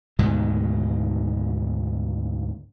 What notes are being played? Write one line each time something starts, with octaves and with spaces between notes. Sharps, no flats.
D2 G#2 B2 D#3